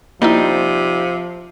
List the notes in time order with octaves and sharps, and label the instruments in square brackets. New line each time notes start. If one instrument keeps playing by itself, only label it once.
[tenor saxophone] C3 [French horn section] F3 [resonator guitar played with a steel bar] G3 D#4 [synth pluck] A#3 E4